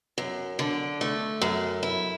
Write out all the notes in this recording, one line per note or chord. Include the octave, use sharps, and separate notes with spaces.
F#2
D3
A3
F#2
E4